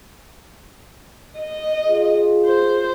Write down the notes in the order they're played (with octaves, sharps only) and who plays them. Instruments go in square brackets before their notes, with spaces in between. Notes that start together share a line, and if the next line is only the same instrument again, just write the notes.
[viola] D#5
[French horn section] F4 [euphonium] G#4
[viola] C5